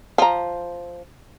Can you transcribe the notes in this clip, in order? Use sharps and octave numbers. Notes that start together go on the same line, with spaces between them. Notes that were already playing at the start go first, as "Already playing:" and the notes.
F3 A#5